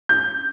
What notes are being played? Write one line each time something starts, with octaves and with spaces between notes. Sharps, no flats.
G6